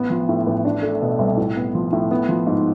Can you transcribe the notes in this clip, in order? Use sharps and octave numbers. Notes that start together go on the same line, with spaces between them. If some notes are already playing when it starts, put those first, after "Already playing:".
Already playing: A1 B3
F3
A2
A1
D4
A3
B2
C2
A2
B3
F3
A2
B3
F3
G#2